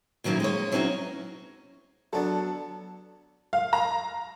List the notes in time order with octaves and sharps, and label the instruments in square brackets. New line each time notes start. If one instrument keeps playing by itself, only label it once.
[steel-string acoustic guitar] A#2 D#3 F#3 A#3 C#4 E4
G#3 A#3 C#5
E3 F#3 C4 C#4 D#4 F#4
[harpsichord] F#3 B3 [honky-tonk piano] D4 A4
[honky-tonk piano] F5
A#5